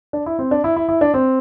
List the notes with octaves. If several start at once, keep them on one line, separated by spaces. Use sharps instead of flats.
D4
E4
C4
D4
E4
E4
E4
D4
C4